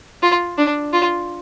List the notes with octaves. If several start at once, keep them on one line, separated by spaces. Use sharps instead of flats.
F4
D4
F4